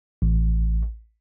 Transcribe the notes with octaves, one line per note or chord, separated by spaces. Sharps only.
A1